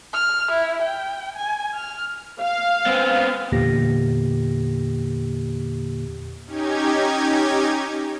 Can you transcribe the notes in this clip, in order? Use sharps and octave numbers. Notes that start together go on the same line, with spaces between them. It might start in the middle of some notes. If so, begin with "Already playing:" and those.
F6
E4
G5
G#5
F6
F5
B3 C4
E2 A#2 D3 A#3 G4 A#6
C#4 D#4 G4 G#6